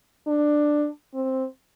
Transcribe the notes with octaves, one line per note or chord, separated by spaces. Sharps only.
D4
C4